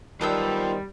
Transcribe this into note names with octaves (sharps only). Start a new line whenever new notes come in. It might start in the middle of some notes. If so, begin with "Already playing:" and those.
D#3 G3 B3 F4 C5 A5 E6